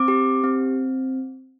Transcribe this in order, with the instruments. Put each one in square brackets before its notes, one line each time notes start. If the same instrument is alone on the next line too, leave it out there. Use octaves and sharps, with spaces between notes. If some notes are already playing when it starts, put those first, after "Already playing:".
Already playing: [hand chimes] C4 D6
G4
C4